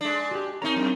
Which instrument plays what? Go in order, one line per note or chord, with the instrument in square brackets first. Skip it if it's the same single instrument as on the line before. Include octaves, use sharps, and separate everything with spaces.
[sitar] G#3 D4
[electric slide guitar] F#4 G4
[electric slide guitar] C4 A#4 A#5 [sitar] C#4 D#4
[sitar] F#2